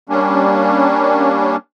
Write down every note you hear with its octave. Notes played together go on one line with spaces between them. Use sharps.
G3 A#3 C#4 D4